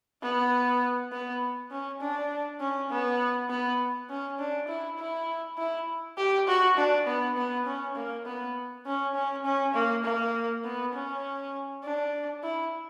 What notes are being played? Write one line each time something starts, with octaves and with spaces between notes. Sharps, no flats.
B3
B3
C#4
D4
C#4
B3
B3
C#4
D4
E4
E4
E4
G4
F#4
D4
B3
B3
C#4
A#3
B3
C#4
C#4
C#4
A#3
A#3
B3
C#4
D4
E4